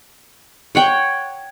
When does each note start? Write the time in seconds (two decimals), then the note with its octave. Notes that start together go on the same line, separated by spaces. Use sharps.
0.75 C#5 F#5 G5